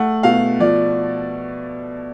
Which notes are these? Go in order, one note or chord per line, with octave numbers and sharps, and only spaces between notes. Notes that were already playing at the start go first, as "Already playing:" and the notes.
Already playing: A3 F#5
B2 F5
F3 D5